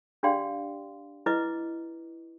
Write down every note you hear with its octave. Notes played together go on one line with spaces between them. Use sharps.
D4 G4 D5 F5 G5 C6
E4 B4 D#5 D6